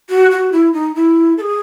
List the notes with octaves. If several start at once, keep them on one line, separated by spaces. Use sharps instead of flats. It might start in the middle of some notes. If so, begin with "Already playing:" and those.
F#4
F#4
E4
D#4
E4
A4
G#4